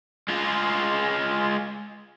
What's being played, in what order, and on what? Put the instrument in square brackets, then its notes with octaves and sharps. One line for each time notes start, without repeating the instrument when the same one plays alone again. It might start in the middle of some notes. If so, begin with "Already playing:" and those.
[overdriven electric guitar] G#3 F4